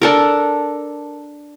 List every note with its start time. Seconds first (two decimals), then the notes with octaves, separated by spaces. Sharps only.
0.02 D4 A4 A#4